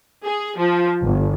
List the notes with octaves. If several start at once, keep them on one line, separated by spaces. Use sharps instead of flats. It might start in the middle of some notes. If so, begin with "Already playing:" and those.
G#4
F3
G1